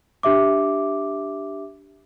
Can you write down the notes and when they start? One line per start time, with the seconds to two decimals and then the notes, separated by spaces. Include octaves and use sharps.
0.23 D4 G4 E5 D6